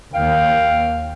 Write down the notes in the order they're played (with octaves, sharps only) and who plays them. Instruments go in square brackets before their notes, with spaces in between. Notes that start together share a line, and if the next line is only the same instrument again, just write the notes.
[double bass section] D#2 [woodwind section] F5 G5